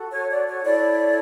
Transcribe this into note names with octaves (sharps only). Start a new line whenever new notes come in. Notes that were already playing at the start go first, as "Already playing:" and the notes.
Already playing: F#4 A4
C#5
D5
C#5
E4 A4 C#5 D5